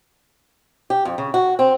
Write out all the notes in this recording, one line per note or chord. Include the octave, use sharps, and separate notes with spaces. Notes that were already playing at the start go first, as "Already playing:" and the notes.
G4
F2
C#3
F#4
C4